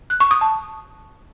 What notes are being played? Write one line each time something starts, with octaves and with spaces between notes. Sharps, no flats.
F#6
C#6
D#6
A5